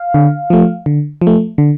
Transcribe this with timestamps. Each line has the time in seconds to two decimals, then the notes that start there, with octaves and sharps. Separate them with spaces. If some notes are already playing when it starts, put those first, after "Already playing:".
Already playing: F5
0.14 D3
0.50 F3 A3
0.86 D3
1.22 F3
1.27 A3
1.58 D3